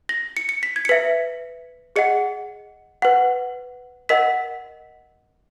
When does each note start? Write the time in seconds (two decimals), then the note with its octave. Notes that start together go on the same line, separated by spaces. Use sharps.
0.09 A#6
0.37 C#7
0.49 C#7
0.63 B6
0.76 G#6
0.85 C#7
0.89 B4 E5 B6
1.96 G#4 D#5 F#5 C#7
3.02 B4 F#5
4.09 A#4 D#5 F#5 B6